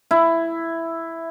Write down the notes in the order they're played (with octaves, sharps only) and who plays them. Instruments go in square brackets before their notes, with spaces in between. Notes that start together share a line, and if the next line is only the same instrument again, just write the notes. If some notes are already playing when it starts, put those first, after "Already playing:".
[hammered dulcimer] E4